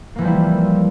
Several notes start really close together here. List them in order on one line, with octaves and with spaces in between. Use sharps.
A#3 E3 F3 G3 E4